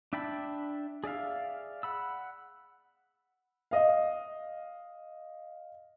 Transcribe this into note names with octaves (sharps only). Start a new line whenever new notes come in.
D4 E5 G5 A5 B5
G#4 D5 E5 F5
F#5 B5 E6
D#5 F5